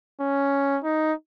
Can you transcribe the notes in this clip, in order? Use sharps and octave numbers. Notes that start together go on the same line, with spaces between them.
C#4
D#4